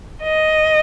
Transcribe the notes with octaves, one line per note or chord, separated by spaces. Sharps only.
D#5